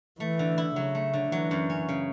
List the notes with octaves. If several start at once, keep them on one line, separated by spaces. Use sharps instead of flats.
E3 A3
D3
E4
C#3 F#3
A3
D3
E3 F#3
F#2
C#4
C#3